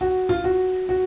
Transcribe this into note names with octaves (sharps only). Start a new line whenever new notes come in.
F#4
F4
F#4
F#4